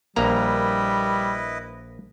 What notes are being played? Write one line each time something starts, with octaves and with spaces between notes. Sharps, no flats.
A#1 G3 A#3 E4 B4 D#5 A#5